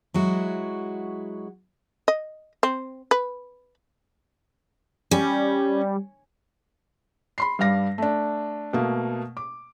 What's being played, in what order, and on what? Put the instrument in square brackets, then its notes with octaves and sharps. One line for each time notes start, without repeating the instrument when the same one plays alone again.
[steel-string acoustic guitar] F#3 G#3 E4 F#4
[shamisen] D#5
C4
B4
[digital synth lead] G3 [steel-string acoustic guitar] C#4
[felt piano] B5 C6 C7
G2 G3 F5 A#6
A3 D4
B2 A3 A#3
D6